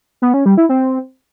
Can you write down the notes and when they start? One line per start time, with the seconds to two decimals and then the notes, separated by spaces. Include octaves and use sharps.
0.22 B3
0.34 C#4
0.46 G3
0.57 E4
0.69 C4